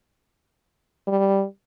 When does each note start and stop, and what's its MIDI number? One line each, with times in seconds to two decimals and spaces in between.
1.07 1.44 55